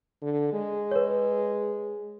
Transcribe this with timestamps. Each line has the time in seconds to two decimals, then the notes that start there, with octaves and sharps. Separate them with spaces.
0.22 D3
0.53 G#3
0.91 B4 C#5